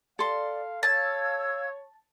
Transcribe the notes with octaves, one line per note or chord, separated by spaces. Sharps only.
A4 D5 F5 C6
C#5 F5 A5 E6 G#6